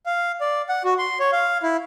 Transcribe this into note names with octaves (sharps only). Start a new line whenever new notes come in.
F5
D5
F#5
F#4
C6
C#5
F5
E4